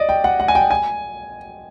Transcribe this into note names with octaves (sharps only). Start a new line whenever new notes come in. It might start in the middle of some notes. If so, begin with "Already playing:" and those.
Already playing: D5 D#5
G5
F#5
F#5
G#5
G5
G#5